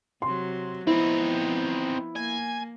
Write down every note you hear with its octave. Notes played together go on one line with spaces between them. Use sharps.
C3 F#3 C6
F3 B3 C4 D#4 E4
A#3 G#5